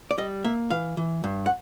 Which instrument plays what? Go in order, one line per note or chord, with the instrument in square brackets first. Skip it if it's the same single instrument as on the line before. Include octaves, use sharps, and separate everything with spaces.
[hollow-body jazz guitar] D5
G3 D#5
A#3 E5
E3 F5
E3
G2
F#5